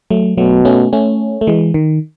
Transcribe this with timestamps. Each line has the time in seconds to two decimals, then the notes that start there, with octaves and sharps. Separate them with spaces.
0.10 F#3 A3
0.37 B2 F#3 A3
0.65 A3 C#4
0.93 A3 C#4
1.41 A3
1.47 E3 G#3
1.74 D#3